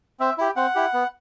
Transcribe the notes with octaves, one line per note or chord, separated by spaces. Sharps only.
C4 E5
E4 G4
C4 F#5
E4 G4
B3